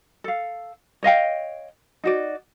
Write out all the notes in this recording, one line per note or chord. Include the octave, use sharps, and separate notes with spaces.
A4 F5
C#5 D#5 F5 G5
D#4 F#4 D5